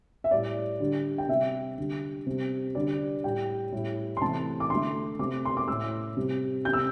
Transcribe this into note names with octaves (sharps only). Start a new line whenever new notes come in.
E5
A2 G3 D5
D3 G3
G5
C3 G3 E5
D3 G3
C3 G3
D3 G3 D5
A2 G3 G5
A2 G3
C6
C3 E3 A3 A5
D6
D3 A3 C6
C3 A3 D6
C6
D6
A2 A3 E6
C3 G3
C3 G3 G6
E6